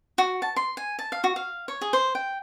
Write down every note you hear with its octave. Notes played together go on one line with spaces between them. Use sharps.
F#4
A5
C6
G#5
A5
F5
F#4
F5
C#5
G#4
C5
G5